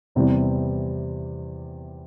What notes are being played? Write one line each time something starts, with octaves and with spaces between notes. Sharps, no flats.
E2 C3 E3 G3